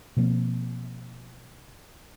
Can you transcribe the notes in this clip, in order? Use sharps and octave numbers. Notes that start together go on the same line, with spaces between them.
B2 F3 A#3 C4